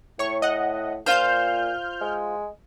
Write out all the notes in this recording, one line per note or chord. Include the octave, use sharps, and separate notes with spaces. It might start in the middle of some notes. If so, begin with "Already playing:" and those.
A2 C#5 C#6
D#5 F#5
A#2 F4 C5 F6 G6
G#3